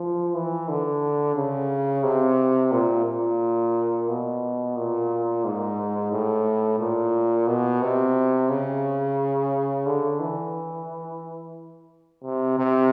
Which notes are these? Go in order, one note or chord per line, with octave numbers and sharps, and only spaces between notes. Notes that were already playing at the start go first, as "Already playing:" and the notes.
Already playing: F3
E3
D3
C#3
C3
A#2
A#2
B2
A#2
G#2
A2
A#2
B2
C3
C#3
D3
E3
C3
C3